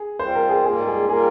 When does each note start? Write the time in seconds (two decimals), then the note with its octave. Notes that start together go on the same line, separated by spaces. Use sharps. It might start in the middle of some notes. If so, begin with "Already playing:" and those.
Already playing: G#4
0.19 G3 C4 F4 C5
0.35 A#4
0.49 G#4
0.65 G#2 G3 A#3 F4 G#4
0.87 G#4
1.09 G3 A#3 F4 G#4 A#4